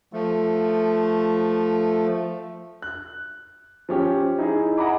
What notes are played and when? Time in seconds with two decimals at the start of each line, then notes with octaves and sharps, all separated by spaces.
0.13 F3 A3
2.82 F#6
3.89 F3 C#4 G4
4.38 D#4 E4 G#4
4.78 D#5 F#5 G#5 A#5 B5 D6